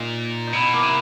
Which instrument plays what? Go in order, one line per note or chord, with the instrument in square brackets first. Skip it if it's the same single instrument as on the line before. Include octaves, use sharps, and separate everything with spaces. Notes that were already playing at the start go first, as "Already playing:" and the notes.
Already playing: [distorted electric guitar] A#2 [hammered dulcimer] D#4
[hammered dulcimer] D#4
[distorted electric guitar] B2 [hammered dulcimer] E4
[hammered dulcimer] A#3
[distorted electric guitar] C3 [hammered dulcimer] B3